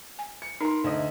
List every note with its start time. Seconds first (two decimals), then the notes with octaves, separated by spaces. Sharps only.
0.19 G#5
0.42 C#7
0.61 D#4 A#4 C6
0.84 D2 D#5